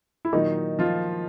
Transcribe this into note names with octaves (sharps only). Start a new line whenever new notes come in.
E4
A#2 D#3 F#3 D#4
F3 F4